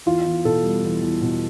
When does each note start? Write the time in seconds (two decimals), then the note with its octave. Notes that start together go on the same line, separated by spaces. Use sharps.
0.06 E2 F4
0.26 E2
0.45 B2 A4
0.64 G3
0.84 E2
1.02 E2
1.21 B2